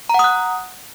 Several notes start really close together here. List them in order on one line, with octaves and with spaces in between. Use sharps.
A#5 F#5 D#6 F#6